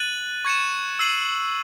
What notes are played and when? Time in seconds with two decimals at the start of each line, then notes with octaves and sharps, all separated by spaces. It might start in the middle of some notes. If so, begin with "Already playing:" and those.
Already playing: F#6 A6 D#7 F#7
0.45 C#6 G#6 C#7 E7
0.99 E6 C7 D#7 F#7